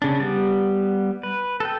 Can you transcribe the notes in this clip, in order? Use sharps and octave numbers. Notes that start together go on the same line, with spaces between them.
C#3 D4
G3 B3
B4
A4 G5